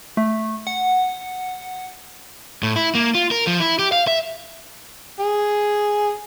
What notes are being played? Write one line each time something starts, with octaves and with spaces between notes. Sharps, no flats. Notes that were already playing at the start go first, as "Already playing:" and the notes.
A3
F#5
A2
E4
A#3
F4
A#4
F3
E4
G4
F5
E5
G#4